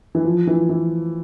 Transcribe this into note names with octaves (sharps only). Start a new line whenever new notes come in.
E3
F3
E3
E3